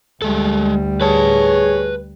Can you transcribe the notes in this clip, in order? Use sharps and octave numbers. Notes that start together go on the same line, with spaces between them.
D2 G3 G#3 A4
G#4 B4 C#5 A5